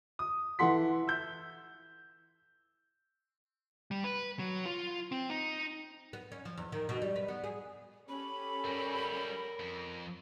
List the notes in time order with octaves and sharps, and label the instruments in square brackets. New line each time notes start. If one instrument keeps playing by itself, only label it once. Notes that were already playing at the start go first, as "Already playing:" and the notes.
[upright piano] D#6
E3 E4 A4 F#5 C6 B6
E6 G6
[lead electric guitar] G3
B4
F#3
F4
C4
D#4
[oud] B3
C#4
F3
E2
D#3
B2
G3
B4
B3
G#4
[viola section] C#4 G4 A4 [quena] B5
[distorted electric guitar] F#2 G3 [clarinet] A#4
[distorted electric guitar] F2